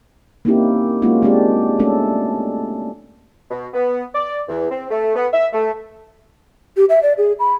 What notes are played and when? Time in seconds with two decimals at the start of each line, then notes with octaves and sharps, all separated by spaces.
0.45 A#3 C4 C#4 D#4 E4 G4
1.02 G#3 A#3 C#4 D#4 F4 F#4
1.22 G#3 C4 D4 G4 D5
1.79 G#3 A3 C#4 D4 A4
3.50 B2
3.74 B3
4.14 D5
4.48 E2
4.71 C4
4.90 A3
5.15 B3
5.32 E5
5.53 A3
6.77 G4
6.89 E5
7.03 D5
7.18 G#4
7.39 B5